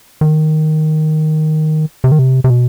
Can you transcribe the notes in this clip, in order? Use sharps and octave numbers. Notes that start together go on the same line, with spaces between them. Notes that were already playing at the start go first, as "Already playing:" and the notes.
D#3
C3
D#3
C3
C3
B2